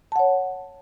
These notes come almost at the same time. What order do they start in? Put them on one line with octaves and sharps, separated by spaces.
A5 F#5 C#5